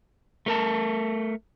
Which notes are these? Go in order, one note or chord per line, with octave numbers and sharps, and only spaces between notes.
A3 A#4 A5